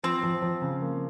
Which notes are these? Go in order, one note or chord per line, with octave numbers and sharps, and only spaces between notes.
F3 C4
F3
F3
C#3
A#3